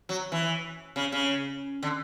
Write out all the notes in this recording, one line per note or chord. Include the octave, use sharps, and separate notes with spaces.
F#3
E3
C#3
C#3
D3